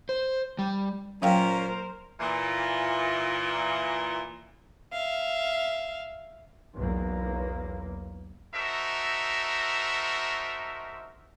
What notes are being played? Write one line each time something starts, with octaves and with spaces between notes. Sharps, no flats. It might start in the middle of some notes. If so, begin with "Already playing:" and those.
C5
G3
A#2 F#3 C#4 A#4 C5 F5 G5
A#2 E3
E5 F5
B1 E2 A#3
D#4 F#4 A4 A#4 C5 E5